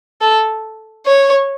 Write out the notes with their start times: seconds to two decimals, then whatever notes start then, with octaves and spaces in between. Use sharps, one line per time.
0.21 A4
1.06 C#5